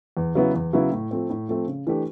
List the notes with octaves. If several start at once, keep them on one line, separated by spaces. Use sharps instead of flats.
E2
C#3 F#3 B3 E4
E2
C#3 F#3 B3 E4
A2
F3 A3 C4
A2
F3 A3 C4
C#3
E3 A3 D4 G4